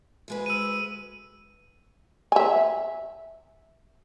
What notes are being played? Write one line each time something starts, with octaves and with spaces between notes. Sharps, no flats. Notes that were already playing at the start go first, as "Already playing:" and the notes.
D2 G#3 B4
E6 D#7
E5 G#5